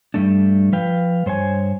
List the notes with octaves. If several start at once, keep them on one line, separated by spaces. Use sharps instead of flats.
G2 C3 G3 A3 D4
F3 B4 F5 G5
G2 C5 C#5 G#5